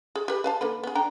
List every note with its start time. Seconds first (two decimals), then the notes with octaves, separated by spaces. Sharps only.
0.16 G#4
0.28 G4 B4
0.44 B4 F5 A5
0.61 D3 A#3 B4
0.84 B3 G#4
0.95 D4 G5 A#5